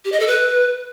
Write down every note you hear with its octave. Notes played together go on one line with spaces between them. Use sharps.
G4
D#5
A4
B4